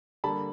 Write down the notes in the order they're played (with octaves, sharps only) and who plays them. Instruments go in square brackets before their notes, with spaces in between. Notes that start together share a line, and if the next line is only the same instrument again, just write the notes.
[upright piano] D3 G3 A#3 A5 B5